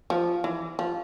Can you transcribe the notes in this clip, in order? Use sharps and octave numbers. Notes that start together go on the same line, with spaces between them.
F3
E3
F3